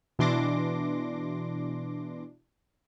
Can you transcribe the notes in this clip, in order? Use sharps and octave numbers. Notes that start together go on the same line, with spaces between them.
B2 E3 D4 C6 D6 A#6